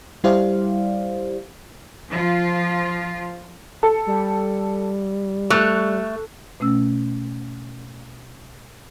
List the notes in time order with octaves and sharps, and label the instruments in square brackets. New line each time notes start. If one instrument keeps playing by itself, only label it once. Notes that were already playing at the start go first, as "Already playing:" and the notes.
[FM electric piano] G3 E4 G4 C5 D5 F5
[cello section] F3 F4
[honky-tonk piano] A4
[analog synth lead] G3
[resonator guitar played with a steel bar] A3 [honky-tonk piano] C#6 F#6 F7
[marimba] B2 A3 C#4 E6